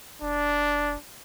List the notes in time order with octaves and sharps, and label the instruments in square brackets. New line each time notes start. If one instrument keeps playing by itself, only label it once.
[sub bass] F1 [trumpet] D4